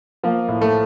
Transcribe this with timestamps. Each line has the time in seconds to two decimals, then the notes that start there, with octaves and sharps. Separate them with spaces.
0.23 F3 A#3
0.48 A2
0.61 A3